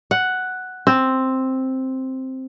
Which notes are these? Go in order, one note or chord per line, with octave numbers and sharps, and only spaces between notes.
F#5
C4